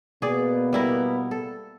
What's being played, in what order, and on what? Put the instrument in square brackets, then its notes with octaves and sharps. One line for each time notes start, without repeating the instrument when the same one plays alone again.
[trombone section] B2 A#3 B3 [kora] G#4 D5
[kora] G3 E4 A#4
A4